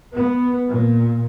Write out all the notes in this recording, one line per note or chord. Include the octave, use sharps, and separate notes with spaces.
B3
A#2